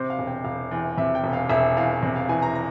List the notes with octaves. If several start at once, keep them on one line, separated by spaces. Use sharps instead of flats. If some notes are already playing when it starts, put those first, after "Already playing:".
Already playing: C3 C5
F5
E1
G5
E1 F5
E2
C3 E5
G5
E1
F5
E1 E5
E2 F5
C3
F5
E3 G#5
A#5
A#5